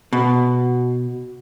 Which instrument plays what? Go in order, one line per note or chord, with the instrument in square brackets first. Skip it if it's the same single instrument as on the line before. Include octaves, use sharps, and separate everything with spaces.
[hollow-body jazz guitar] B2